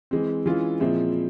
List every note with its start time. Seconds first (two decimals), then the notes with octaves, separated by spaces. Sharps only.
0.11 E3 G#3 C4
0.46 E3 G#3 C#4 F4
0.80 A#2 F3 G#3 C4 E4